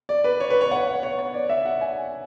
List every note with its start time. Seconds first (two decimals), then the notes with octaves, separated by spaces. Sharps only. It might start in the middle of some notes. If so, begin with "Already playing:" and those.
0.09 D5
0.24 B4
0.40 C#5
0.50 B4
0.61 C#5
0.71 F#5
0.87 F#5
1.03 C#5
1.19 C#5
1.34 D5
1.50 E5
1.66 F#5
1.81 G#5